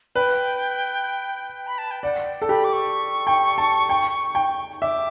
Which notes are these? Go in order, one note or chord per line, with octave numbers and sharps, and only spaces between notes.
B4 G5
B5
A5
G5
D5 F#5
G5
A4
G4 B5
D6
C#6
G5
A5
G5
G5
E5 D6